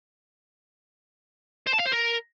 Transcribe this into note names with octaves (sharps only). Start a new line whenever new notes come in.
C5
A5
F5
C5
A#4